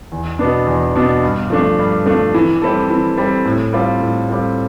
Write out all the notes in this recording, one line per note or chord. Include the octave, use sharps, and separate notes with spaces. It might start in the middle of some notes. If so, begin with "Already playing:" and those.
E2
B2 B3 D4
E2
B2 B3 D4
G2
F3 A3 D4
G2
F3 A3 D4
E3
G3 C4 E4 A4
E3
G3 C4 E4 A4
A2
G3 C4 F4 A4
A2
G3 C4 F4 A4